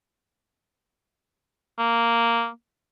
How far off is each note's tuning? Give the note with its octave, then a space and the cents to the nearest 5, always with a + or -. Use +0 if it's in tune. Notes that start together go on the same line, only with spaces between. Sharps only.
A#3 -5